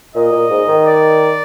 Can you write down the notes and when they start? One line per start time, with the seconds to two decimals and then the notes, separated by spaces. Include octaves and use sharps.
0.15 A#2 D#5
0.32 A#2
0.50 G#2
0.68 D#3
0.85 D5